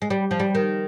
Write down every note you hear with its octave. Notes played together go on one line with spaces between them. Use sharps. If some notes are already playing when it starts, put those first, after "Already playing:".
G#3
G3
F3
G3
D#3